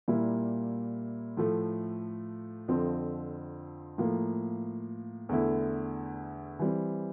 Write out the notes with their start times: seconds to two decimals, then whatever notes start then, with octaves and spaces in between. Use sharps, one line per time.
0.08 A#2 G3 A#3 E4
1.37 A2 F3 A3
2.68 F2 D3 F3 C4
3.98 A2 F3 A#3
5.29 E2 D3 A3 E4
6.59 E3 G3 C4